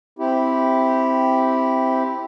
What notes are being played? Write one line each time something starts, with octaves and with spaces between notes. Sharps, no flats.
C4 E4 G4